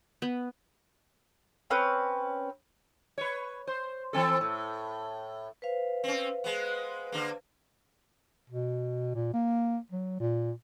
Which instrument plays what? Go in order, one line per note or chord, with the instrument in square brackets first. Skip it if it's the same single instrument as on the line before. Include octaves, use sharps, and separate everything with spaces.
[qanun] B3
[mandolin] C4 C#4 B4
[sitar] B4 C#5
C5
E3 C4 A4
A2
[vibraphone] B4 C5 F5
[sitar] C4 C#4
G#3 B3
D3 A#3
[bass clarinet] B2
A#2
A#3
F#3
A#2